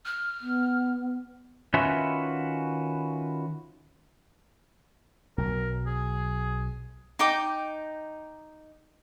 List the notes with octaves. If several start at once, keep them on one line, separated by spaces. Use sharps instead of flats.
F6
B3
D#3 C#4 F4 F#4 B4 E5
B1 F#3 A#4
G#4
D#4 G5 D6